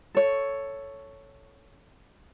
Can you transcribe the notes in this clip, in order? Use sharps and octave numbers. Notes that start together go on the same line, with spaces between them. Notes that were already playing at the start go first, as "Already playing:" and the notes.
A4 C#5